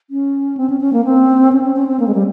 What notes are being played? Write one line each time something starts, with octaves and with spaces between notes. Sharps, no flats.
C#4
C4
C#4
C#4
A#3
C4
C#4
C#4
C#4
C4
A#3
G#3
G3